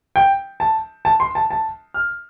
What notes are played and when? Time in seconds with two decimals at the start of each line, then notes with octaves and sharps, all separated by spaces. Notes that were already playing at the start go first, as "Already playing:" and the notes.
0.16 G5
0.60 A5
1.05 A5
1.20 C6
1.35 A5
1.50 A5
1.94 F6